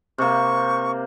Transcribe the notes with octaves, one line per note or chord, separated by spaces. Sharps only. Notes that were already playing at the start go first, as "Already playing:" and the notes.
C3 A#3 C#6